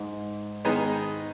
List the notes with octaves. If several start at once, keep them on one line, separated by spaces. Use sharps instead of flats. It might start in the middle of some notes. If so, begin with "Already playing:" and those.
Already playing: G#2
D#3 G#3 B3 D#4